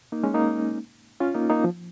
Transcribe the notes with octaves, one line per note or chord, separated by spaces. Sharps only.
A#3 D#4
G#3 C#4
A#3 D#4
C#4 F4
A#3 D#4
A#3 D#4
F3